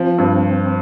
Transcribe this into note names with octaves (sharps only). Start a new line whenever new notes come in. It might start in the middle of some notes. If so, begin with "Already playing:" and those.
Already playing: F3 C4
G2